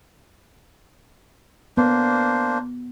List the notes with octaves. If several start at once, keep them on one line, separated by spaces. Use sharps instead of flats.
A#3 B3 D4 C5